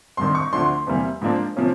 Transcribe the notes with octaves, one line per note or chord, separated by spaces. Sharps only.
G#1 G2 D#3 C6
C#6
D2 D3 F3 A3 D4 C6
E2 C3 E3 G3 A#3
G#2 F3 A#3 D4
C3 F3 A#3 C#4